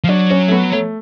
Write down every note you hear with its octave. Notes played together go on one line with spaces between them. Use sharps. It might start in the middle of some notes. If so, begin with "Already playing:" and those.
F3
F#3 D4
C#4
A3
B3
A3